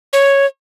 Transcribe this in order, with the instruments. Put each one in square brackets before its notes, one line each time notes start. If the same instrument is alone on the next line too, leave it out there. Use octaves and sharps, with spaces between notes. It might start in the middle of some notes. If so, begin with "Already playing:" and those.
[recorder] C#5